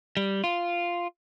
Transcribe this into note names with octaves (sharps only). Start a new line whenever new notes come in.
G3
F4